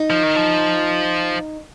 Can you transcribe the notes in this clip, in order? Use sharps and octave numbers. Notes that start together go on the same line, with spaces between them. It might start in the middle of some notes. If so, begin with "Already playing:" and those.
Already playing: D#4
F3
D#3
F3